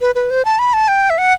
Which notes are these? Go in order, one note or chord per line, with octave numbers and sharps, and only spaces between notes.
B4
B4
C5
A5
B5
A5
G5
E5
F#5